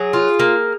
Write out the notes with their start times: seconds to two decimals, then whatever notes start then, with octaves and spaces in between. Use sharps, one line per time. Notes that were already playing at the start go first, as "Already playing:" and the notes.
Already playing: F#3 G#4
0.13 F4
0.40 A#3